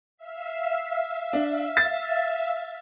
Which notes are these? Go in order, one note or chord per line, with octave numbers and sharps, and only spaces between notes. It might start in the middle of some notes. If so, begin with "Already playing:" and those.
E5 F5
D4
A6